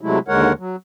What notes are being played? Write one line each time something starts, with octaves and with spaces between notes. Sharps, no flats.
C3 F#3 G#3 A3 E4
D#2 D3 G#3 A#4 C#5 F#5
F#3